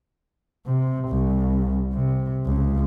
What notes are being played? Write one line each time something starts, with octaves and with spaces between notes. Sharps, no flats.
C3
C2
C3
C#2